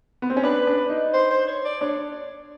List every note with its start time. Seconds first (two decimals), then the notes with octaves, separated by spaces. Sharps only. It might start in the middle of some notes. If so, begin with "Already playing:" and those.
0.22 B3
0.30 C4
0.37 C#4
0.44 D4 B4
0.67 D4
0.90 D#4
1.13 C5
1.30 C5
1.47 C#5
1.65 D5
1.81 D4 C#5